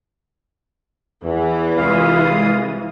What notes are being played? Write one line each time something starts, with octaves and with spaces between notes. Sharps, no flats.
E2 E3
C2 G#3 F4 F5 D#6